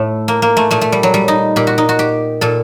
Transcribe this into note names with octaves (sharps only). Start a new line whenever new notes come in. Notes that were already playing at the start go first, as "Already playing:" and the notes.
Already playing: A2 A3
A#3
A#3
A3
A#2 A3
A3
G3
F#3
G3
D#4
A#2 G4
F#4
D#4
F#4
G4
A#2 A4